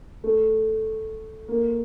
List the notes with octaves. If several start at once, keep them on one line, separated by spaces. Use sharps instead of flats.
A3
A#3